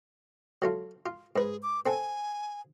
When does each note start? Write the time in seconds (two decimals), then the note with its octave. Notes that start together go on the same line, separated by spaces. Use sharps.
0.62 F#3 A3 F4
1.06 F4
1.36 G#2 G#4 B4
1.63 D6
1.86 C4 A4 F#5 G#5